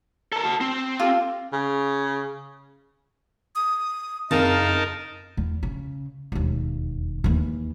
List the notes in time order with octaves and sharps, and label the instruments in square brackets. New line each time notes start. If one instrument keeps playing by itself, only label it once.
[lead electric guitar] A4 A#4
F#4 A5
C4
[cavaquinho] F4 G4 A4
[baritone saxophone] C#3
[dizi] D#6
[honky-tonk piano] F#1 F2 [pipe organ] D#4 A#4 A5 [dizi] F5
[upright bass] E2
C#3
E1 D#2
D#2 E3